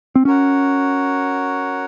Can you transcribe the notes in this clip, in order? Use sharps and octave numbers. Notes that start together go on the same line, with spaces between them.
C4
C#4 F#4 A#4 C#5 F#5